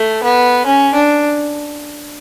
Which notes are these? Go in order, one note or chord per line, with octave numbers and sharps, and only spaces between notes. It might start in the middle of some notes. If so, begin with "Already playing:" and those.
Already playing: A3
B3
C#4
D4